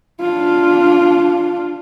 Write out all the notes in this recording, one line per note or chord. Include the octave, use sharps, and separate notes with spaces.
D4 F4